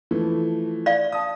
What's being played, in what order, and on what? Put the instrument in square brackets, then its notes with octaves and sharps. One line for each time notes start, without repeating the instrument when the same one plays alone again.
[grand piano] E3 F3 A3
[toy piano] D5 F5
[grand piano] A5 D#6